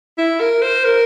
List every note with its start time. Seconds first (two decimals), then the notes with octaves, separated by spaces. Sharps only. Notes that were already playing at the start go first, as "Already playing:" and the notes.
0.18 E4
0.41 A#4
0.62 C5
0.85 A#4